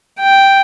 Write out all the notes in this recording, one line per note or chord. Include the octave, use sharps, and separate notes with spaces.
G5